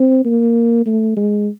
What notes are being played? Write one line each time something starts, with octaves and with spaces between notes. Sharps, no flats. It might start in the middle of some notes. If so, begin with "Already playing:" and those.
Already playing: C4
A#3
A3
G#3